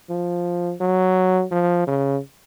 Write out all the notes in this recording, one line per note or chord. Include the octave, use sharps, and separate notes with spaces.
F3
F#3
F3
C#3